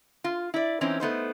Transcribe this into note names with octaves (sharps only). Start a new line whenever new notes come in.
F4
E4 D5
E3 C4 C#4 D#4
A3 B3 D#4 C5